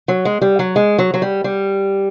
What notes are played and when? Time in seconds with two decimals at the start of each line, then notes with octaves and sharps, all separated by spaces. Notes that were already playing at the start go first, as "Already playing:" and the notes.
0.08 F#3
0.25 G#3
0.42 G3
0.59 F#3
0.76 G#3
0.98 F#3
1.14 F#3
1.22 G3
1.44 G3